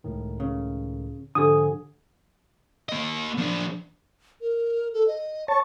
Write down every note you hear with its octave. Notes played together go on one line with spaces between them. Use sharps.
C#2 A2 D#3
C#3
G#2 D3 F3 D4 G4 A4 G#5 D#6
A#3 D#5
F3 D4
A#4
A4
D#5
C#5 A5 C#6